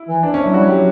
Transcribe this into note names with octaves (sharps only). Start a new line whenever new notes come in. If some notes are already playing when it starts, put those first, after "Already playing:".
Already playing: E4
E3
D4
C#4
F#3 E4
G3 F#4
F#3
G4
F#3